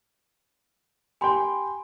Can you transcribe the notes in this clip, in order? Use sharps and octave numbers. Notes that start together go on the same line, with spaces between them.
G4 G5 G#5 B5 C6